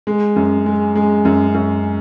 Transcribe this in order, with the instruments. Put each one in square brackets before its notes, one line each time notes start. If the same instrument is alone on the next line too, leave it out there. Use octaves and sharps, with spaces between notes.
[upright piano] G#3
F#2
G#3
G#3
F#2
F#2